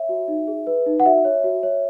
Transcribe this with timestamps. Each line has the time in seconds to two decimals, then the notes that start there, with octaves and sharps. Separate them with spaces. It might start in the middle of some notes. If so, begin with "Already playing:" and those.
Already playing: C#5 E5
0.09 F#4
0.28 D#4
0.48 G#4
0.67 B4
0.86 D#4
1.00 F#5
1.06 F#4 E5
1.25 C#5
1.44 F#4
1.63 C#5